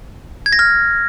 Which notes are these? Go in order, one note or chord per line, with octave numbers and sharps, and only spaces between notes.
G#6
A#6
F6